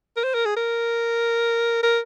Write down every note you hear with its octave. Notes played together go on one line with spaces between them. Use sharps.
A#4
C5
A#4
G#4
A#4
A#4